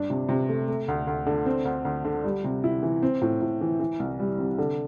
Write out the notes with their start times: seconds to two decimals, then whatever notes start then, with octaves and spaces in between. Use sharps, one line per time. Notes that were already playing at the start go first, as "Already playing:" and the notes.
Already playing: G2 D4
0.10 C3
0.29 C3
0.49 A3
0.68 A3
0.88 D2
1.07 D2
1.26 D3
1.46 C4
1.65 D2
1.85 D2
2.05 D3
2.24 G3
2.44 C3
2.64 E4
2.83 E3
3.03 C4
3.22 A2
3.41 A2
3.61 E3
3.80 E3
4.00 C2
4.20 G3
4.38 C3
4.58 D3